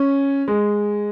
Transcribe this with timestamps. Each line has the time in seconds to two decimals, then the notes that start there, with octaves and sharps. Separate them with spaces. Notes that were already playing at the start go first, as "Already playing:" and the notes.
Already playing: C#4
0.48 G#3